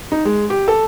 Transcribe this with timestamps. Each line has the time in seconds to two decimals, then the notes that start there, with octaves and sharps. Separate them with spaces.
0.12 D#4
0.25 G#3
0.50 G4
0.68 A4